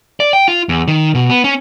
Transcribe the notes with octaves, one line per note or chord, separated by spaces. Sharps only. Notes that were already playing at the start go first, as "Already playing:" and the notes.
D5
G5
F4
E2
D#3
B2
B3
C#4